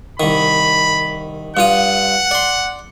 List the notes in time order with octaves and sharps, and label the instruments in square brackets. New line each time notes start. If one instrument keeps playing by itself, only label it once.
[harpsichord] C2 D#3 [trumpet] B5
[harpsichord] G2 F4 D#6 [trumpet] F#5
[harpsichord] D5 C6